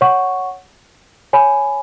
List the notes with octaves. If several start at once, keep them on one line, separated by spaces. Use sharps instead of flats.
C#5 F#5 C#6
C#5 G#5 B5